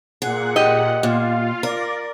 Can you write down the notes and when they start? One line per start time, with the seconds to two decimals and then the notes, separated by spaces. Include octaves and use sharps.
0.22 A#2 G#4 F#5
0.56 G4 D#5
1.03 A#2 F4 F5
1.63 A#4 D5